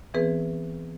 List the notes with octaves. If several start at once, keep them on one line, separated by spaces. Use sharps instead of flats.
E3 B3 C4 G#4 B4